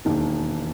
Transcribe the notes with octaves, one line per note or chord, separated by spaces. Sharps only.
E1 D#2 D#3